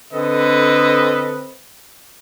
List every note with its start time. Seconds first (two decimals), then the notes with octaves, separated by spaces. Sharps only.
0.13 D3 C4 A4 B4 D#5